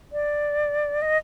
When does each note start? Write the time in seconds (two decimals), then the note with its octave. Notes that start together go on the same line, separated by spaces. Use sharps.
0.12 D5
1.02 D#5